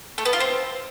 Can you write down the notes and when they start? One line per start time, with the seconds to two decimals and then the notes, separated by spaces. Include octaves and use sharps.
0.18 A3
0.25 B3
0.33 F4
0.40 C4